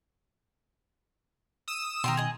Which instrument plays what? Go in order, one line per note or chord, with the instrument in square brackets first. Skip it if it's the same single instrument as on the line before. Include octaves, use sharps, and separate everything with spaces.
[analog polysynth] D#6 E6 E7
[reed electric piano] B2 D#3 [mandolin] A#4 G5 C6
[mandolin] G#4 D#5